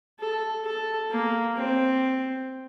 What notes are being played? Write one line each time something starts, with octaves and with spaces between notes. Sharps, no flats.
A4
A4
A#3
C4